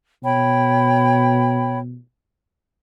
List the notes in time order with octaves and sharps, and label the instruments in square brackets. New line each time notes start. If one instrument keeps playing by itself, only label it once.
[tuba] B2 [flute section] C#5 G5 B5